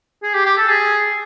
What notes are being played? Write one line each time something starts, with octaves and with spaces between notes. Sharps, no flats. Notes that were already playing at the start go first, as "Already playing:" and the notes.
G#4
G4
G4
A4
G#4